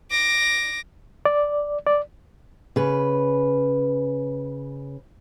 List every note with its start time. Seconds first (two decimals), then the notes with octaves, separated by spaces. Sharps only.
0.11 D6 A#6
1.25 D5
1.87 D5
2.76 C#3 B4